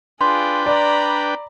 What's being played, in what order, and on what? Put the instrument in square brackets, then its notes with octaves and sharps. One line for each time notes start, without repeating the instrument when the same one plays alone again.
[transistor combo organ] D4 B4 G5 [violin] F4 G#4 [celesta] C6
[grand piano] D5 [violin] A#5 B5